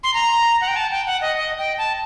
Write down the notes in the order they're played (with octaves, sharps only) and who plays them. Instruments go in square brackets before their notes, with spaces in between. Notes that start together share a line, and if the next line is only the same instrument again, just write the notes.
[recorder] C6
A#5
F#5
G5
A5
G5
F#5
D#5
D#5
G5
A5